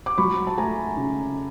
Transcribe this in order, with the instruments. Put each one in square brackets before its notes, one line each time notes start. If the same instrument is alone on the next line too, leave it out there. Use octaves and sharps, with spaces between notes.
[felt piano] D6
F#3 B5 C#6
A5
A3 G#5 A#5
C#3